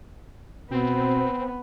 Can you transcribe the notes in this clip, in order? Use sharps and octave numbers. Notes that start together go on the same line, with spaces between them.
B2 B3 C4